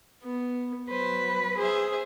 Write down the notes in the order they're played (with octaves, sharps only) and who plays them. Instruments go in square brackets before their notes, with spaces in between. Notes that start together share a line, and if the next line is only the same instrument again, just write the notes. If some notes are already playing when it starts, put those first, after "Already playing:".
[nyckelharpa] B3
[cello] F#3 B4 [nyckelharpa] C5
[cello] G#4 [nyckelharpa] C5 E5